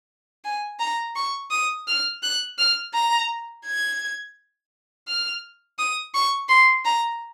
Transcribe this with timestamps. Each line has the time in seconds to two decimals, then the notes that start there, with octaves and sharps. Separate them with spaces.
0.44 G#5
0.80 A#5
1.16 C#6
1.51 D#6
1.87 F6
2.22 F#6
2.58 F6
2.94 A#5
3.65 G#6
5.08 F6
5.79 D#6
6.14 C#6
6.49 C6
6.85 A#5